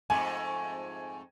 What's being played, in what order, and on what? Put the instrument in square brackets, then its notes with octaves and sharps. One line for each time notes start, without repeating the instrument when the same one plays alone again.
[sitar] F2 G#2 A3 [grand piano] G#5